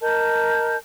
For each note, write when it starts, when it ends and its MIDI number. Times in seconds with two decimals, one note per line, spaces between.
0.02 0.76 70
0.02 0.76 75
0.02 0.76 81
0.02 0.76 91